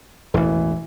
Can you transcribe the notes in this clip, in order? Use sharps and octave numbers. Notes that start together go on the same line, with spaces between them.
E1 A1 E3